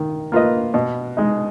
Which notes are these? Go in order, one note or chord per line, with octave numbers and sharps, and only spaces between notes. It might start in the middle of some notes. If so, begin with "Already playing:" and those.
Already playing: D#3
A#3 F4 B4 D#5
B2
G#3 D#4